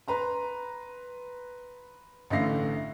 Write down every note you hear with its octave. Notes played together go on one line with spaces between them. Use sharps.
B4 A#5 C6
A1 D3 A3 F5 A#6 C7